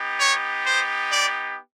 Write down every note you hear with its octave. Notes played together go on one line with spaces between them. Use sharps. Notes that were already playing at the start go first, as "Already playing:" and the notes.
Already playing: B3 D#4 G4
C#5
C5
D5